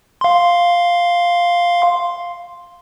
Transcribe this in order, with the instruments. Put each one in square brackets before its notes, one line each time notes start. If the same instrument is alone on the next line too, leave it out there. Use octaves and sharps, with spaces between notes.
[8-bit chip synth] F5 C6